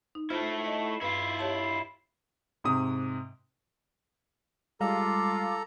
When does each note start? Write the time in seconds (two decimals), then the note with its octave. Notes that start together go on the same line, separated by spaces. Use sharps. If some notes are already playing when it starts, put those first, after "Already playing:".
0.15 D#4
0.30 A3 E4 F4 C5
0.66 D#5
1.01 G2 E4 F4 B4
1.39 G4 C#5 A5
2.64 G#2 C3 D#6
4.81 G3 G#3 F4 A4 F5 A#5 D6